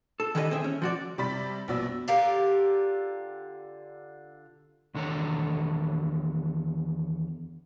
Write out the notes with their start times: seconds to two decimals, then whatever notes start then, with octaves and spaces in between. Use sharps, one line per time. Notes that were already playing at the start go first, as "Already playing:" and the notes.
0.20 A4
0.35 D#3 E3 G3 B4 C5 D#5
0.51 C4 G#4 E5
0.64 C#4
0.82 F3 F#4 D5
1.18 C3 G3 D5 B5 A6 B6
1.68 A#1 B2 B3 D5 E6
2.08 D3 F4 G4 A#4
4.94 E2 D#3 D4 A4 C#5 A#5